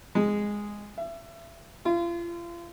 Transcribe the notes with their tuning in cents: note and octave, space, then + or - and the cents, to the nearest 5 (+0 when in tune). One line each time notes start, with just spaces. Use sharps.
G#3 -5
E5 +30
F4 -35